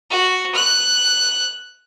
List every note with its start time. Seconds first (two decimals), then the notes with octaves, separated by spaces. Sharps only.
0.11 F#4
0.55 F#6